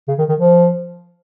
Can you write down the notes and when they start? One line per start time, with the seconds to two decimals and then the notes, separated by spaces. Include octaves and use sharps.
0.08 C#3
0.18 D#3
0.29 D#3
0.40 F3